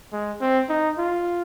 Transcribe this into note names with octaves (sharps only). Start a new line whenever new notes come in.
G#3
C4
D#4
F4